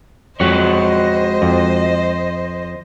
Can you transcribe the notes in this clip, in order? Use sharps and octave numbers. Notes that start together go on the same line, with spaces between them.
F2 G#3 F#4 C5 C#5 D#5
F2